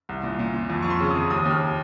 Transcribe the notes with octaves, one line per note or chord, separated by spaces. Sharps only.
C2
A#2
A#2
A#2
F2
F2 C#6
C6
C#3
D#6
F2
D#2 D#6
D#2
F6